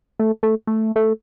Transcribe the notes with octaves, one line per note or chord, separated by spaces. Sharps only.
A3
A3
A3
A3